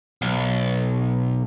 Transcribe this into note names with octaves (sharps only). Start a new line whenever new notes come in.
B1